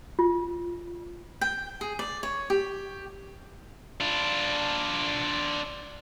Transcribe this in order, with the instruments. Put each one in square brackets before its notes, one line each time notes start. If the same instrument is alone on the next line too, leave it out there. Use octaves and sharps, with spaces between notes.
[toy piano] F4
[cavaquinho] G5
G#4
D5
C#5
G4
[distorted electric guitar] D4 F4